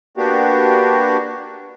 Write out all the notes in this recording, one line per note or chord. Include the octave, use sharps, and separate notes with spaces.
A#3 B3 D4 F#4 G4